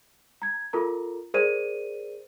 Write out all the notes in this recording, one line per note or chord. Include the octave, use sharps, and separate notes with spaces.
A#5 G#6
F4 A4 A#4 A#5
G#4 A#4 C5 D5 D#7